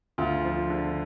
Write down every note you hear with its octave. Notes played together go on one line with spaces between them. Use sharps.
D2 F4
F3
D3